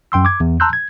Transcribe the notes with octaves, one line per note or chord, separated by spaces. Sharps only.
F#2 G5 C6 E6
D6 G#6
E2
A5 A#5 C6 E6 F#6 G6
G#6